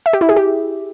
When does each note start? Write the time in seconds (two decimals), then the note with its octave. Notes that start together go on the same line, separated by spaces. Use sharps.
0.06 E5
0.13 G4
0.21 E4
0.29 G#4
0.36 G4